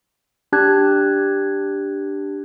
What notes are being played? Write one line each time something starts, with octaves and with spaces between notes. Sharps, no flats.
D4 G4 A5 F#6 G#6